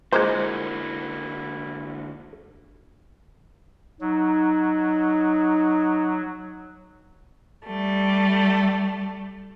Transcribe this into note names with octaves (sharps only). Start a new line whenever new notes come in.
A#2 D3 G#3 A#3 E4 F#4 C5
F#3 D#4
G3 A3